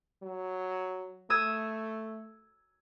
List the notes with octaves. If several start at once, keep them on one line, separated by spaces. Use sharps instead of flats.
F#3
A3 D#6 E6 G#6